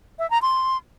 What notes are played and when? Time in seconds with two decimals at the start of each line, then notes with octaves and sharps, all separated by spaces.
0.19 E5
0.30 A#5
0.42 C6